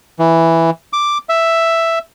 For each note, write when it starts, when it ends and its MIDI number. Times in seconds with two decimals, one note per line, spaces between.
0.19 0.70 52
0.93 1.18 86
1.29 1.99 76